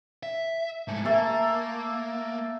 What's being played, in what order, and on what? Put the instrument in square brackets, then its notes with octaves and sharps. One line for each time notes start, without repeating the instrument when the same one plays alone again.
[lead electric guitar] E5
G#2 A3
[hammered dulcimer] A3 A4 [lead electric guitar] A#3